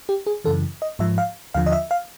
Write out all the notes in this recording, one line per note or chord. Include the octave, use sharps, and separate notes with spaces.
G4
G#4
F#2 C#3 E3 A4
D#5
G#2 F3 E5
F5
D#2 D3 F3 F5
D#5
E5
F5